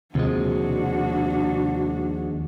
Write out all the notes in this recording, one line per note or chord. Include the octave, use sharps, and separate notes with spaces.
D#2 C3 F3 G#3 D4 F#4